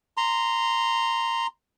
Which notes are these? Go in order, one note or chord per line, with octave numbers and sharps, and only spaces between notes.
A#5 C6